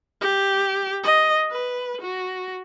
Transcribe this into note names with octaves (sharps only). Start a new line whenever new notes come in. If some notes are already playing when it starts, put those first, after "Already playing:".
G4
D#5
B4
F#4